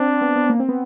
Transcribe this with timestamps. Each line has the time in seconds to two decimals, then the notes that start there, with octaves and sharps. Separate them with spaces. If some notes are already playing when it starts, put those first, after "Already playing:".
Already playing: C4 D4
0.21 B3
0.35 B3
0.49 A#3
0.60 C4
0.69 B3